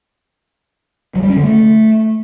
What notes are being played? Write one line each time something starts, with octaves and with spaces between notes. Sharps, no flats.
F#3
G3
C#4
D3
A3